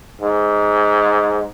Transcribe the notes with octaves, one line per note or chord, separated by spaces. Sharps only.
G#2